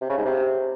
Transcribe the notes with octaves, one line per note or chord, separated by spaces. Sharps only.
C3
C#3
G#2
C3